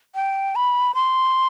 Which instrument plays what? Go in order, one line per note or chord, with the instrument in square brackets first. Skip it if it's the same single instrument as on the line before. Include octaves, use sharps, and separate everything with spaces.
[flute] G5
B5
C6